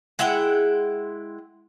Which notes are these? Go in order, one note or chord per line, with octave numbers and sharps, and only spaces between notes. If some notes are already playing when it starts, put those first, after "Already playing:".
G#3 E4 F#5 G5